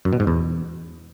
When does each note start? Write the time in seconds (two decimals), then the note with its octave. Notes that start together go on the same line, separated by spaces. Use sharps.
0.05 F#2
0.13 B2
0.20 G#2
0.27 E2